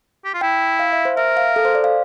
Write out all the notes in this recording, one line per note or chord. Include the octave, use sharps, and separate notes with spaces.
G4
F4
E4 G5
F5
E5
C5
A#4 E5
F5
A4
C5
D5
F5